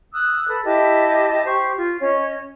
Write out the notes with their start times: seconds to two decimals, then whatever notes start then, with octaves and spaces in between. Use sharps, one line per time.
0.13 D#6 E6 F#6
0.48 A4 B4
0.64 E4 G4 D#5 A5
1.45 G4 C5 C#6
1.77 F4
2.01 C#4 C#5 D#5